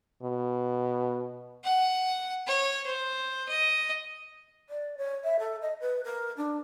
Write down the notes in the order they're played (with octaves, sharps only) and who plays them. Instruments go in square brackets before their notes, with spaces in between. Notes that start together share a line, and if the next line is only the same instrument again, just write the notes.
[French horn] B2
[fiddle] F#5
C#5
C5
D#5
[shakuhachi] D5
C#5
E5
A4
D#5
B4
A#4
D4